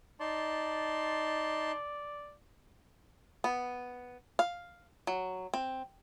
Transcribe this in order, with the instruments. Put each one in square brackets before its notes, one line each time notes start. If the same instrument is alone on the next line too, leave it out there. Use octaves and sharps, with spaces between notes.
[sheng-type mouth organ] D#4 A5 C6 [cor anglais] D5
[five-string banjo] B3
F5
F#3
C4